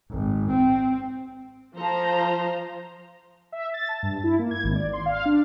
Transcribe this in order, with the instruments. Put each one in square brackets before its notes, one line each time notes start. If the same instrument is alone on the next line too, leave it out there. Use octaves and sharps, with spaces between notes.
[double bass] G#1
C4
[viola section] F3 C5 A#5 [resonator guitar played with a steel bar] A4 A5
[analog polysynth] E5
A6
A5
G2
E4
A#3
G#6
G#1
D5
C6
F5
D4